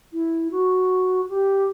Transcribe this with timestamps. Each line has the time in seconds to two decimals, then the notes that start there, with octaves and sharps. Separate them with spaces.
0.13 E4
0.51 F#4
1.28 G4